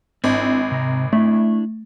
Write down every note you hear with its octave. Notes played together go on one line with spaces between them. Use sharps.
G#1 C4 D4 E4
C3 A#5
A3 D4 E4